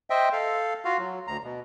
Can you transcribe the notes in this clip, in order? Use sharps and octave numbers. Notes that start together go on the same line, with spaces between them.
C5 D#5 E5 G5
A4 F5
F4 F#4 F5
F#3
D2 A#5
B2